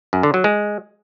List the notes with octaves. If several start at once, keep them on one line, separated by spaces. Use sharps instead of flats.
F#2
D3
F#3
G#3